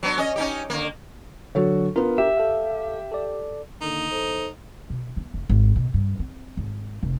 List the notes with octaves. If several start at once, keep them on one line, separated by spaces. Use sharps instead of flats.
F#3 B3 D4
C#4 D#5
C#4 D#4 G4
D3 A#3
D3 F#3 D4 F#4 A4 C#5
B3 D4 F4 A#4
G4 E5
A4 F5
A4 D5
D3 D#3 A#3 D#4
E2 A4 C5
B2
B3
F1
G#1
B2
G2
C4
G#1
F1